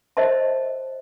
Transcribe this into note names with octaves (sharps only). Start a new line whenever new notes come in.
A#4 C5 D#5 E5 A5